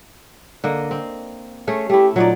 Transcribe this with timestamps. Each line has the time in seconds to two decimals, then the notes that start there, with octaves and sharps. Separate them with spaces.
0.64 D3 A#3 D#5
0.91 C4
1.67 A3 C#4 G#4
1.89 A3 E4 G4
2.16 A#2 F#3 D#4 D5